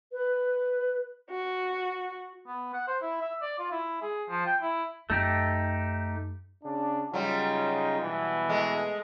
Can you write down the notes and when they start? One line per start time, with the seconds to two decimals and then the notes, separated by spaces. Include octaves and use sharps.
0.12 B4
1.29 F#4
2.47 B3
2.73 F#5
2.87 C5
3.02 E4
3.21 E5
3.42 D5
3.59 F4
3.71 E4
4.02 G#4
4.29 F3
4.46 G5
4.62 E4
5.10 F#2 A3 D#4 G4
6.64 C#3 D4
7.14 C#3 F#3 G3 D#4 F4
8.00 B2 E3 B3
8.49 G#3 A3